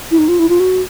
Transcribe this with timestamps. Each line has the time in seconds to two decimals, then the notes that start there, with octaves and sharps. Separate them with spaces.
0.11 E4
0.18 D#4
0.28 F4
0.39 E4
0.49 F4
0.60 F#4